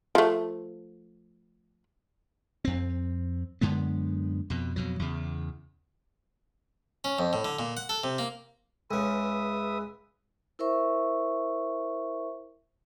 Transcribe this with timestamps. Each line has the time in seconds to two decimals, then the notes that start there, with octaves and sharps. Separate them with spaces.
0.15 F3 A3
2.65 F2 C4
3.61 F#2 D3 G#3 B3
4.50 F2 B2
4.76 F2 B2 F#3
4.99 E2 C#3
7.04 C#4
7.19 F2
7.33 A2
7.45 D3
7.59 A#2
7.77 F#5
7.89 A4
8.04 C3
8.18 A#3
8.91 C#2 C#3 B4 E5 D#6
10.59 E4 A#4 C5 E5 C#6